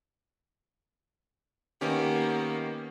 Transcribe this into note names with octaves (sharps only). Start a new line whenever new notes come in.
D#3 A#3 B3 C#4 G4